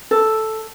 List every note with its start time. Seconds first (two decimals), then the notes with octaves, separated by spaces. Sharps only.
0.11 A4